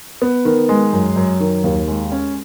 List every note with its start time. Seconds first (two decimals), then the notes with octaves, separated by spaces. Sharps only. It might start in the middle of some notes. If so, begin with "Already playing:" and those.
0.22 B3
0.45 D#3
0.69 G#3
0.93 F#2
1.16 F#2
1.40 D#3
1.64 D#2
1.88 G#3
2.12 C#4